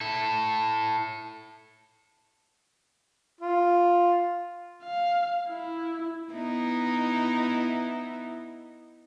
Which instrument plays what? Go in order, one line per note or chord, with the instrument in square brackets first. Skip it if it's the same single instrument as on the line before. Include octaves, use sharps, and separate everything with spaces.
[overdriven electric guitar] E4 A4
[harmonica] F4
[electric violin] F5
E4
[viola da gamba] B3 D#4 E4